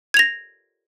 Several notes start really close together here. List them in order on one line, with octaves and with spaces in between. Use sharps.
G#6 F7 A#6